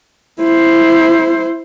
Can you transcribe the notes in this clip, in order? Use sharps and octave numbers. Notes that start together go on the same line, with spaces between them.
E4 C5